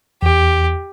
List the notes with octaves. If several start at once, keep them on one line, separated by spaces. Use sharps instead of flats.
E2 G4